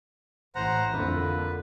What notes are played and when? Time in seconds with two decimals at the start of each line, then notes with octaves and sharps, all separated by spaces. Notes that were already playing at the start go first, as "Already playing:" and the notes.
0.55 A1 A2 C5 F#5 A#5
0.92 F2 D3 A#3 B4